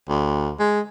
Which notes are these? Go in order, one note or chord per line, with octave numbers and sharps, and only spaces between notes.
D2
G#3